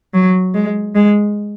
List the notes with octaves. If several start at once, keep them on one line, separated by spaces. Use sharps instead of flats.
F#3
G#3
G#3